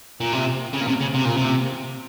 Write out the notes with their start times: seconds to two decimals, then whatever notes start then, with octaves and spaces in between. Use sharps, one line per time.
0.20 A#2
0.32 C3
0.73 C#3
0.81 A#2
0.87 C3
1.01 C#3
1.14 C3
1.25 A#2
1.37 C3